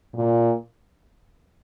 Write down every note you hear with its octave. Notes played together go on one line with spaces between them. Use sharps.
A#2